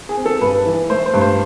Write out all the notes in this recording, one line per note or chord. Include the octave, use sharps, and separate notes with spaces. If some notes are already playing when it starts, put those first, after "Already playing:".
G#4
C4
A4
G2 B4
E3
A3 C5
C5
G2
C5